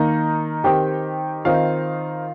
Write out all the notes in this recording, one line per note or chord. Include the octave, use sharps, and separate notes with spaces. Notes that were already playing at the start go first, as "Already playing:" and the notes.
Already playing: D#3 A#3 D#4 A#4 A#5
D#3 C4 D#4 G4 G5
D#3 C4 D#4 F4 F5